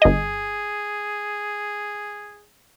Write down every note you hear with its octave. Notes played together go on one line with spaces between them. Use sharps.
G1 G#4 D#5